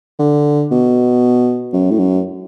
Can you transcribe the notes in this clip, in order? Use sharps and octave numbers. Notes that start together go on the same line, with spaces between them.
D3
B2
F#2
A2
F#2